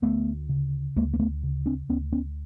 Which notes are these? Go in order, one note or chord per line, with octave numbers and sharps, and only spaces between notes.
D2 A3 B3
C#3
D2 G#3 A#3
A#3
A3 B3
C#3
C4 D4
D2 B3 C#4
B3 C#4